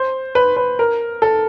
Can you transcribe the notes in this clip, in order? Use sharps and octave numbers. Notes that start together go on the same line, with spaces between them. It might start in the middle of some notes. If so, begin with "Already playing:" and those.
Already playing: C5
B4
B4
A#4
A4